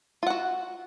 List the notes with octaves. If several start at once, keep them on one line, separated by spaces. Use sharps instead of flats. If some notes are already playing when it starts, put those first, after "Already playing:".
F4 F#4 F#5